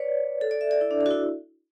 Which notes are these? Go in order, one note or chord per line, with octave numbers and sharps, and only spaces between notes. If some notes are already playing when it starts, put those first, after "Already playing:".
Already playing: B4 C#5 D5
A4
D5
E5
D5
E4
D4
D4
F#4
E4